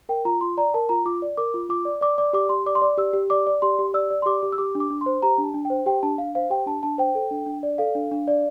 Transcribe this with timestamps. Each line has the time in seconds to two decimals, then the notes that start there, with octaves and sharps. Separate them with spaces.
0.09 A#4 G5
0.25 F4 A#5
0.41 F4 C6
0.57 D5 A#5
0.74 A#4 A5
0.89 F4 A#5
1.06 F4 D6
1.22 D5
1.37 A#4 D6
1.54 F4
1.69 F4 D6
1.85 D5
2.01 D5 D6
2.18 D5 D6
2.33 G4 D6
2.49 G4 C6
2.66 D5 D6
2.75 C6
2.82 D5 D6
2.97 G4 E6
3.13 G4
3.30 D5 D6
3.47 D5
3.62 G4 C6
3.79 G4
3.94 D5 E6
4.10 D5
4.22 C6
4.26 G4 D6
4.43 G4
4.52 E6
4.58 G4 D6
4.75 D4
4.80 D6
4.90 D4
5.01 C6
5.06 C5
5.22 G4 A#5
5.38 D4
5.44 A5
5.54 D4
5.65 G5
5.70 C5
5.86 G4 G5
6.03 D4 A5
6.18 D4 F5
6.35 C5 F5
6.50 G4 G5
6.66 D4 A5
6.83 D4 A5
6.98 C5 G5
7.15 A4
7.31 D4
7.46 D4
7.63 D5
7.78 A4 F5
7.95 D4
8.11 D4
8.28 D5